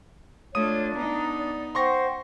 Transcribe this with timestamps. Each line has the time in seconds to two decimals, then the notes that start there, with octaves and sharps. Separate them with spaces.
0.55 A3 D4 F4 C#5 D#6 D#7
0.94 B3 D#4 A#5
1.39 D5
1.75 C5 F#5 G5 C6 C#6 A#6